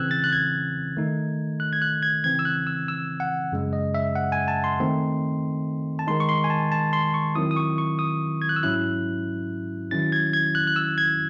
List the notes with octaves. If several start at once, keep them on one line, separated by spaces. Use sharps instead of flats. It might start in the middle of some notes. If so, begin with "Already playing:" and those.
Already playing: C#3 E3 C4 E6 F#6 G#6
A6
F#6
G#6
D#3 A3 D#4
F#6
G#6
F#6
G#6
C#3 E3 C4 G#6
E6
F#6
E6
E6
F#5
F#2 C#3 G#3
D#5
E5
F#5
G#5
A5
C6
D#3 A3 C4 D#4
A5
D#3 G#3 D#4 C6
C#6
C6
G#5
A5
A5
C6
C#6
D#3 F#3 C4 E4 D#6
D#6
C#6
C#6
D#6
G#6
F#6
E6
G#2 F#3 C#4 E4 F#6
D#3 F#3 C#4 E4 A6
G#6
G#6
F#6
F#6
E6
G#6